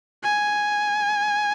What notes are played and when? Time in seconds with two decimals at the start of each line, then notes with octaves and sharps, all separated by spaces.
0.23 G#5